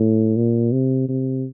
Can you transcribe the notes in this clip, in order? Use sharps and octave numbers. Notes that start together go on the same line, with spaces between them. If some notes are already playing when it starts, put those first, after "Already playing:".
Already playing: A2
A#2
C3
C3